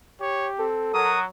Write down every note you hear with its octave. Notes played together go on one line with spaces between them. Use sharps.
G4 C#5
C4 A4
F#3 A#4 D#6